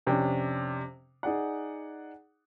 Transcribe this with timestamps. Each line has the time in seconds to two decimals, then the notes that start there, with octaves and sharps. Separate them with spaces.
0.07 F2 C3 C#4 D4 G5
1.23 D#4 G#4 D5 F#5